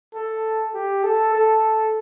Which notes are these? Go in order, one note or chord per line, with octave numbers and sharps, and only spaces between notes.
A4
G4
A4
A4